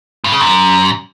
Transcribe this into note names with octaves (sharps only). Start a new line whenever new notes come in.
G2
C#3
F#2